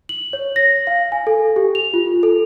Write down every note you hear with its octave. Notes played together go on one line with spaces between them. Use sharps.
F#7
C#5
A#6
F5
G#5
A4
G4
F7
F4
A4